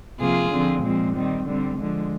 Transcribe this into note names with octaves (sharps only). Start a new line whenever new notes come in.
C3 F3 A#3 F4 G#4
D3 F3 C4
A#2 F3 G#3 C4
D#3 G3 C4
D3 G3 C4
D3 F3 G#3